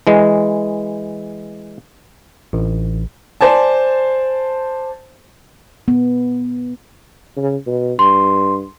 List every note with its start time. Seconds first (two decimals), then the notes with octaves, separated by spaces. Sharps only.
0.07 E3 G#3
2.53 A1
3.41 C5 D5 G#5 A5
5.88 B3
7.37 C#3
7.67 B2
7.99 G2 C6